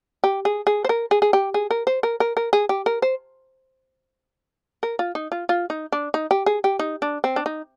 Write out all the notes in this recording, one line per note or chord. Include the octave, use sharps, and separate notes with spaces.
G4
G#4
G#4
C5
A#4
G#4
G#4
G4
G#4
A#4
C5
A#4
A#4
A#4
G#4
G4
A#4
C5
A#4
F4
D#4
F4
F4
D#4
D4
D#4
G4
G#4
G4
D#4
D4
C4
D4
D#4